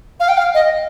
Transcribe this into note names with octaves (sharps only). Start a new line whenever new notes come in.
F5
G5
F5
D#5